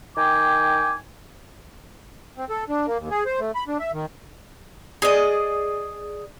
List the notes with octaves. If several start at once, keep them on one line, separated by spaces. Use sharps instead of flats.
D#3 G5 G#5 D6
C4
A4
D4
A#3
D#2
G#4
C5
A3
B5
D4
E5
D#3
G#4 D5 D#5